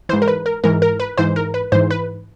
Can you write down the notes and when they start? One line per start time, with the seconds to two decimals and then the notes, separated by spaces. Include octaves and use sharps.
0.09 G#2 E3 C5
0.22 A#4
0.28 B4
0.46 A#4
0.64 G#2 E3 A#4
0.82 A#4
1.00 B4
1.17 G#2 E3 C5
1.36 A#4
1.54 B4
1.72 G#2 E3 C5
1.90 B4